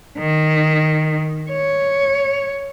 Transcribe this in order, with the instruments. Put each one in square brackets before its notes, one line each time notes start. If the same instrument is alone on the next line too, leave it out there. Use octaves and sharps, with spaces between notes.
[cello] D#3
C#5